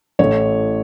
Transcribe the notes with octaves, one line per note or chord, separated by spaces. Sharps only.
A1 A2 A3 C#5